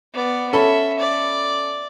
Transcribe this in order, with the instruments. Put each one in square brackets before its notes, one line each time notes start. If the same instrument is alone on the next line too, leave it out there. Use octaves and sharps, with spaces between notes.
[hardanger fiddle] B3 D5
[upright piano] C#4 A4 B5 [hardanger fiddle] E5
[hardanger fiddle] D5